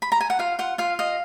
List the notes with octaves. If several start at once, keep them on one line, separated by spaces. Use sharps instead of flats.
B5
A#5
G#5
F#5
F4 F5
F4 F#5
F4 F5
D#5 F5